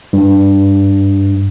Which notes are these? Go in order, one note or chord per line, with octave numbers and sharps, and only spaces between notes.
G2